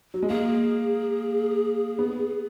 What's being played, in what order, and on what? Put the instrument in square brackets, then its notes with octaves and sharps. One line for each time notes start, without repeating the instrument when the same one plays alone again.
[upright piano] F#3
G#3
[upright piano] A#3 [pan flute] G#4
[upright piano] B3